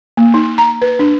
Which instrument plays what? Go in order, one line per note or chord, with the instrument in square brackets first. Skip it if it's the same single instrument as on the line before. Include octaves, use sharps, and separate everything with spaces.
[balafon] A#3
D#4
A#5
B4
D4